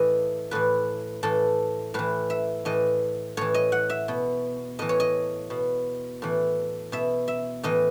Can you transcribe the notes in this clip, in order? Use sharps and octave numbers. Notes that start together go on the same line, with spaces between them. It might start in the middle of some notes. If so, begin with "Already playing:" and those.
Already playing: A2 E3 D#5
A2 E3 B4
A2 E3 A4
A2 E3 B4
E5
A2 E3 D#5
A2 E3 C#5
D#5
F#5
E5
B2
A2 E3 D#5
C#5
D#5
B2
A2 E3
B2 E5
E5
A2 E3 D#5